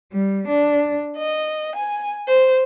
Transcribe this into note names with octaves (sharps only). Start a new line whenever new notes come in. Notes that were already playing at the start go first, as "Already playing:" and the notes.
G3
D4
D#5
G#5
C5